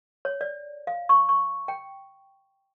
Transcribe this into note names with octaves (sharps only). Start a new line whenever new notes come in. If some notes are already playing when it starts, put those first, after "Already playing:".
C#5
D5
F5
C#6
C#6
G5